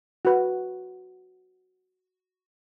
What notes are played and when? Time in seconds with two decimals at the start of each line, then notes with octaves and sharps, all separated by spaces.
0.25 F#4 B4